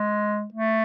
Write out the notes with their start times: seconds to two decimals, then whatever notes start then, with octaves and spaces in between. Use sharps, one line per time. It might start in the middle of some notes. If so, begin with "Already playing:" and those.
Already playing: G#3
0.54 A3